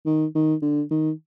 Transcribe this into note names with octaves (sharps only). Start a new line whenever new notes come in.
D#3
D#3
D3
D#3